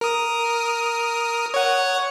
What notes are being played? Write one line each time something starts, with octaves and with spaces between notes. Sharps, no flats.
A#4 D#6
C#5 F#5